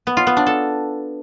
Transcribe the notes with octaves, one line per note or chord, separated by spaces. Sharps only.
B3
F4
B3
D4
A4